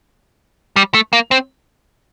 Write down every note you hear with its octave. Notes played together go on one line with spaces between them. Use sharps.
G3
A3
A#3
C4